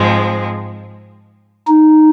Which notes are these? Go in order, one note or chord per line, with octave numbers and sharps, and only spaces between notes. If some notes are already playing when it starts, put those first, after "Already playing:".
Already playing: G#2 F3 G#3 C4
D#4